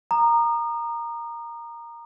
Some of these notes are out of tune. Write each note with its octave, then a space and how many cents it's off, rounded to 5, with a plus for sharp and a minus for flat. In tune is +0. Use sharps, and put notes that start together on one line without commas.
A#5 +0 D#6 -35